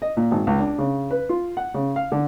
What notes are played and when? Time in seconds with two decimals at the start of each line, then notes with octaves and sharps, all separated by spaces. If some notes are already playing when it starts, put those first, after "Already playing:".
0.02 D#5
0.17 A#2
0.31 G#1
0.47 C#2
0.60 D4
0.79 C#3
1.11 B4
1.29 F4
1.57 F#5
1.74 C#3
1.96 F5
2.12 D3